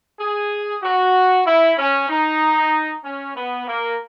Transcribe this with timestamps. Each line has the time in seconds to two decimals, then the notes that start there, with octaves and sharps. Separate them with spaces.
0.20 G#4
0.83 F#4
1.45 E4
1.77 C#4
2.09 D#4
3.03 C#4
3.35 B3
3.67 A#3